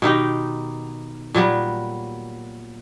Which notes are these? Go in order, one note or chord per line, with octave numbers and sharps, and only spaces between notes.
B2 D#3 D#4 G4
A#2 F#3 G3 B3